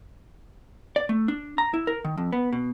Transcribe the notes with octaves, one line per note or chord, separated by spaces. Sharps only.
D5
A3
D4
A#5
E4
A#4
D#3
F2
B3
B2